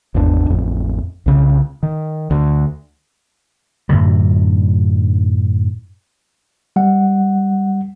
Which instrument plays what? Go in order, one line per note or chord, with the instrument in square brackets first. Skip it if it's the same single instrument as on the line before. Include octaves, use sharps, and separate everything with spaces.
[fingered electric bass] G#1 E2 D4
A1 F2
C2 C#3
D#3
D2
[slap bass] F#2 A2 D3 F#3
[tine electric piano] G3 F#5